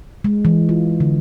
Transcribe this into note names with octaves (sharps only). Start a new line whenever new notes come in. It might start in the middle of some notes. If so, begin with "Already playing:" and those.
G#3
E3
F4
D3